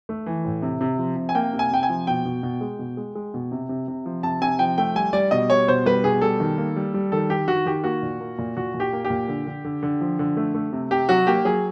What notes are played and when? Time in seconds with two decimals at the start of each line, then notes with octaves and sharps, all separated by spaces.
0.09 A3
0.26 E3
0.45 A2
0.62 C3
0.81 C3
0.98 F3
1.16 C3
1.29 G#5
1.35 A#3 G5
1.53 C3
1.59 G#5
1.71 C3 G5
1.83 G#5
1.89 F3
2.07 B2 G5
2.25 B2
2.43 B2
2.61 G#3
2.79 B2
2.97 G#3
3.15 G#3
3.34 B2
3.52 C3
3.69 C3
3.88 C3
4.06 F3
4.23 C3 A5
4.41 C3 G#5
4.59 F3 G5
4.78 A3 G5
4.95 G3 G#5
5.13 G3 D5
5.31 B2 D#5
5.50 G3 C#5
5.68 B2 C5
5.85 G3 B4
6.04 B2 G#4
6.21 G3 A4
6.40 D#3
6.58 A#3
6.76 G3
6.94 G3
7.12 D#3 A4
7.29 D#3 G4
7.48 D#3 F#4
7.66 D#3 G4
7.84 A#3 F#4
8.02 A#2
8.20 A#3
8.38 A#2
8.57 A#2 F#4
8.74 A#2
8.80 G4
8.93 A#3
9.05 G4
9.10 A#2
9.28 D3
9.47 D3
9.64 D3
9.83 D3
10.01 F3
10.19 D3
10.37 A3
10.55 A3
10.73 C3
10.91 C3 G4
11.09 F#3 F#4
11.27 A#3 G4
11.45 F#3 G#4